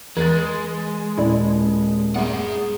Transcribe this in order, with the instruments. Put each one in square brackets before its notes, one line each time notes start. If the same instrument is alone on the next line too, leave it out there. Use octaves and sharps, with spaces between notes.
[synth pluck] E2 [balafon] E3 [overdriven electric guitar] G#3 [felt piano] B4 A6
[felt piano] D#1 [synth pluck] E4 A4 D5
[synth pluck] G3 A3 B3 [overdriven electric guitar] G#4 F#5